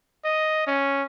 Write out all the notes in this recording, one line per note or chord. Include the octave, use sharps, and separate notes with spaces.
D#5
C#4